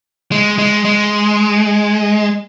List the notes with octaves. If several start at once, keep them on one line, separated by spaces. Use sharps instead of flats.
G#3
G#3
G#3